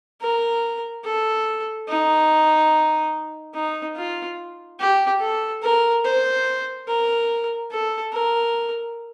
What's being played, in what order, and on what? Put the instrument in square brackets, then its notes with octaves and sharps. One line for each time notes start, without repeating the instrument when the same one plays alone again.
[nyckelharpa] A#4
A4
D#4
D#4
F4
G4
A4
A#4
C5
A#4
A4
A#4